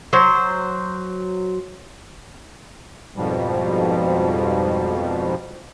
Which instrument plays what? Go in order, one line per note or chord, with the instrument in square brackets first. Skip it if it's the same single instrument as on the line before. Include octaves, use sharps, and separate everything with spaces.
[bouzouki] F#3 C5
[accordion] F2 G#2 B2 F3 G3